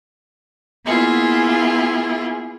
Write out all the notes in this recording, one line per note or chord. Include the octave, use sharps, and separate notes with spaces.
A#3 B3 E4 F4 G#4